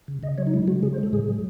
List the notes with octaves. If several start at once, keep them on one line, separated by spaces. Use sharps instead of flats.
C#3
C#3 D#5
F#3 C#5
D#4
G#3 E4
G#3 F#4
C#3 G#4
C5
G#3
A4
A2 G#4
F#3